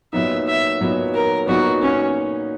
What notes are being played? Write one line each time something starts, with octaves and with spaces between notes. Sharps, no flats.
A#2 F#3 B3 D#4 E5
E5
A#2 F#3 B3 D#4
A#4
A#2 F#3 B3 D#4 F#4
C#4